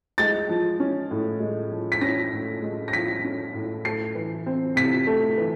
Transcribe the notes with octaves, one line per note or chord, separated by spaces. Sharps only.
G#3 A6
F3
C#4
A2
G#3
F3
B6
C#4 A#6
A2
G#3
A#6
F3 B6
C#4
A2
A3 C7
E3
C4
C3 B6
A3
E3